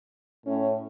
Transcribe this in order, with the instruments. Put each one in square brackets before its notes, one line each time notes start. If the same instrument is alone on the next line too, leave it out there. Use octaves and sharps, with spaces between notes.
[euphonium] A2 [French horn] C#4